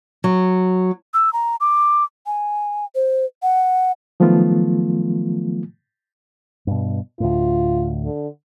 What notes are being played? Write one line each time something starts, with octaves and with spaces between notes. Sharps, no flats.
F#3
E6
A#5
D6
G#5
C5
F#5
D#3 F3 F#3 A3 B3 F4
G2 B2
D2 A2 F4
D3